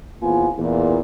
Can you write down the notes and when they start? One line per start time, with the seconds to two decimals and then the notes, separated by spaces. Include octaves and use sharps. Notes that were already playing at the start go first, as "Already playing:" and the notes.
0.22 E2 A#2 B3 C4 F4 G#5
0.58 E2 A#2